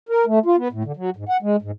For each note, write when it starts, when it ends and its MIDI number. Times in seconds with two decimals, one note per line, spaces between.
0.09 0.25 70
0.27 0.39 57
0.46 0.56 65
0.57 0.68 59
0.72 0.83 45
0.85 0.92 50
0.97 1.10 54
1.16 1.24 44
1.29 1.37 78
1.42 1.56 56
1.62 1.71 44